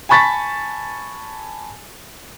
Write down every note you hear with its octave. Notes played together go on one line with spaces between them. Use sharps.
G#5 A5 B5 C#6 A6 B6